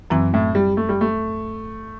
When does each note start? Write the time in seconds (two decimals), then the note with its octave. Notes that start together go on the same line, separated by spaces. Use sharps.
0.10 F#2 E3 F#3 C4 E4
0.34 A2
0.55 G3
0.77 A3
0.89 G3
1.01 A3